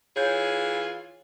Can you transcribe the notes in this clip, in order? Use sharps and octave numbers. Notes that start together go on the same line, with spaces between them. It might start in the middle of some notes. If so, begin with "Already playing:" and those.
E3 F4 G#4 C#5 G6